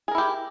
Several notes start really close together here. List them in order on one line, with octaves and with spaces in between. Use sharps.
G#4 A#4 E4 G4